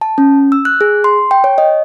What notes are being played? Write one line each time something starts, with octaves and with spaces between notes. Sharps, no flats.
A5
C#4
E6
F#6
G#4
C6
G5
C#5
D#5